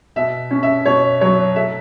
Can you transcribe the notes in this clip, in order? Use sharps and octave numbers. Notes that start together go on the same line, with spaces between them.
B2 E5
C#4
E5
B2 C#5
F#3 C#5
A3 E5